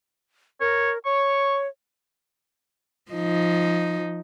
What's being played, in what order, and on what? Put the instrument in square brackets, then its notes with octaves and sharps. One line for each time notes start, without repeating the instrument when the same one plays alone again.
[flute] A#4 [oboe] C#5
[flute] C#5 [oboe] C#6
[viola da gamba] F3 D#4